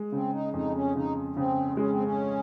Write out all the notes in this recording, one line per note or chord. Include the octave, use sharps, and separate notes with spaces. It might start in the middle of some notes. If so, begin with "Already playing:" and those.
Already playing: G#3
C#3 C4
D#4
F2 D#4
C#4
C#3 D#4
C#3 C4
G#3 C#4
C4
C#4